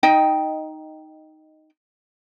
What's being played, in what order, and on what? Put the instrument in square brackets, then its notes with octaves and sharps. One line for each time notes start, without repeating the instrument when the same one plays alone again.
[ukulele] D#4 D#5 G5